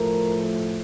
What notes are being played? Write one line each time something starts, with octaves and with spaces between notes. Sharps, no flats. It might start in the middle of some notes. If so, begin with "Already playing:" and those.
Already playing: A2 F3 A3 A#4